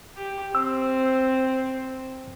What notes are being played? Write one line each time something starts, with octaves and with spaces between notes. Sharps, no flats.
G4
C4 E6